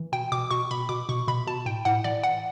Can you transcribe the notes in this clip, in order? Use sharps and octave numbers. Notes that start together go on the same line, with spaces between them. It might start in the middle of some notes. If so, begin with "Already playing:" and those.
Already playing: E3
B2 G5
B2 D6
B2 C#6
B2 B5
B2 D6
B2 C#6
B2 B5
B2 A5
A2 G5
A2 F#5
E3 D5
E3 F#5